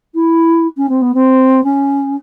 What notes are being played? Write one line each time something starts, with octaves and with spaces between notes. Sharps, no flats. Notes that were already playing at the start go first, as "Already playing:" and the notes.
E4
C#4
C4
B3
C4
C#4